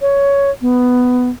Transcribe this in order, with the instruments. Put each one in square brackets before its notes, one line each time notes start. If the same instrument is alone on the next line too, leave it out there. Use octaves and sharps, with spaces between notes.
[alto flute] C#5
B3